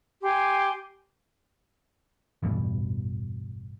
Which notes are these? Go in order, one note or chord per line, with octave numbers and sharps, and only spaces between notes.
G4 G#5 C6
A1 E2 G2 B2